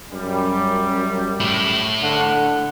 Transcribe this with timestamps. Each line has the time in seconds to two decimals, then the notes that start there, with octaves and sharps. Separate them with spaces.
0.12 F#2 G3
1.40 A3 E4
2.02 D3 A4 F#5